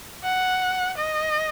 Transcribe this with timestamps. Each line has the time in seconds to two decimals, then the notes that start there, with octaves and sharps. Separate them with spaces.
0.24 F#5
0.98 D#5